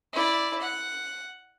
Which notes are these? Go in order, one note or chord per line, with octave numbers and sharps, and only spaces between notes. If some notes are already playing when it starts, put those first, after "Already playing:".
E4 D5
F#5